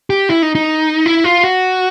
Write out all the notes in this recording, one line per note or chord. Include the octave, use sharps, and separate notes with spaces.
G4
E4
D#4
D#4
E4
F4
F#4